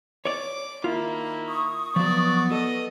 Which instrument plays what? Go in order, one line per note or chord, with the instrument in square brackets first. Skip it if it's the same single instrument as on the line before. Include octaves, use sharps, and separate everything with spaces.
[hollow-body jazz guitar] C#5 D5 [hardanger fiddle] D6
[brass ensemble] D#3 A#4 [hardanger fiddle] A#3 E4 [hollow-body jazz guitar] F4
[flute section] C#6 D#6
[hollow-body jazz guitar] F3 F#3 [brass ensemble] B3 [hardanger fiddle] D5
[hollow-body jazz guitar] A4 [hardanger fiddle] D#5